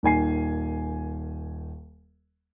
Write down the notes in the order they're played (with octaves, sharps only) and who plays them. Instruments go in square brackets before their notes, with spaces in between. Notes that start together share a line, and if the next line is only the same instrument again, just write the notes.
[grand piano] D#1 D#3 G#5 C7